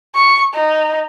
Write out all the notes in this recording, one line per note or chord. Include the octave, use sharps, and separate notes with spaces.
C#6
D#4